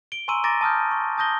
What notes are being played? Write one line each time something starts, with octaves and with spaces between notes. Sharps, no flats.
D7 G7
G#5 A#5 C6 C#6 E6 D#7
A#5 D6 A6 A#6 D7
A5 D#6 F6 G6
C#6
A5 D#6 G6 A#6 G7